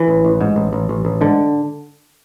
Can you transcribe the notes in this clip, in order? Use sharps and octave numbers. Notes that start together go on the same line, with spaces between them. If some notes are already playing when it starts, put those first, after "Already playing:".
Already playing: E3
A1
A1
G#2
A1
A1
A1
A1
G#2 D3